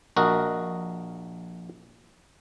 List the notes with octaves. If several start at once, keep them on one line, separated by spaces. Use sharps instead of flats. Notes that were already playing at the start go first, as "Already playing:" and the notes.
A#1 F#4 A#4 D#5